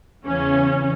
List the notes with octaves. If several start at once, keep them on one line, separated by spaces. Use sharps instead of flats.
E2 C#3 E3 C#4